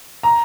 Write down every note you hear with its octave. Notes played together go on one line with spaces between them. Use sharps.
A#5